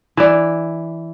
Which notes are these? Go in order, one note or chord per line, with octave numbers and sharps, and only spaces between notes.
E3 D5